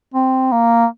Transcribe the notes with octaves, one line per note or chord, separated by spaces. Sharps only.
C4
A#3